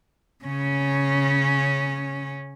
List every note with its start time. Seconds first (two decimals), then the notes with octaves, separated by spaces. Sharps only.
0.45 C#3 C#4